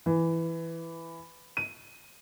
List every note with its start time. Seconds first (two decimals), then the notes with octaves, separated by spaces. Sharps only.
0.06 E3
1.57 D#7